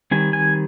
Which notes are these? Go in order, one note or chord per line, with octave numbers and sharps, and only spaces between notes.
D#3 G3 C4 G#5
G#5